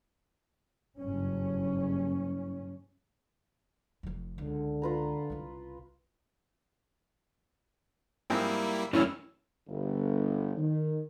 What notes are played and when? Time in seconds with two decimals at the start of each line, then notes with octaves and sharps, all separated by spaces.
0.99 F#1 G2 C#4
4.03 F1 F2
4.38 C#2 D3
4.82 F4 B4 A#5
5.30 C2 C#3
8.30 G#2 F3 G3 A#3 C4 E4
8.93 F#2 A2 E3 C#4 D4 E4
9.68 G1
10.57 D#3